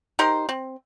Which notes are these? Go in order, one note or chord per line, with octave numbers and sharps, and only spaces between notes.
D#4 G4 A#4 C5
C4